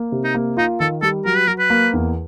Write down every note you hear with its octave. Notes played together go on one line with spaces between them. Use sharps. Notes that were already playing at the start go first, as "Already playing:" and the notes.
Already playing: A#3
C3
D#4
A#3
D#4 F4
D#3 A4
G3 A4
F#3 A#4
B4
F#3 A#4
B4
A#3
E2